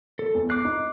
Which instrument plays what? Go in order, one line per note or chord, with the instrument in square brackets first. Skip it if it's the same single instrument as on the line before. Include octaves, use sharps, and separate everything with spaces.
[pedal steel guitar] A4
[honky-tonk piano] E2
[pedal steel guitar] D6 F#6 [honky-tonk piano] C7
[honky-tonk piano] D#4